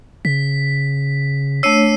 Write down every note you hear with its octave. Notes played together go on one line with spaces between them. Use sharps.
C#3 B6
A3 D4 C#5 E6 C7 D#7